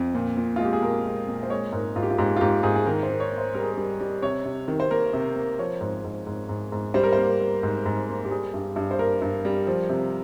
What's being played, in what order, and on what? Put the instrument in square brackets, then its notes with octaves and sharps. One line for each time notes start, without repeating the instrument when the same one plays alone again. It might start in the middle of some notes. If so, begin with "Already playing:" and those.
Already playing: [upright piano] F2
A#2
A#2
G#3 F4
G4
G#4
A#2 A#4
G#3
A#2
C5
G#3 C#5
G#2 A#4
G#2 F4
G4
F4
G#2 G4
F4
G#2 G4
G#2 G#4
G#4
D#3 A#4
C5
D#3
C#5
A#3
C5
G3 A#4
G#4
A#4
G3
G3
C3 C#5
C3
D#3
C5
A#3 A#4
C3
A#3
F3 C#5
G#2
G#2
G#2
G#2
G#2
G3 C5
A#4
A#3 C5
A#3
G#2
G#2
A#3
G4
G3 G#4
G2
G2
C5
A#3 A#4
G2
G3
F3
C3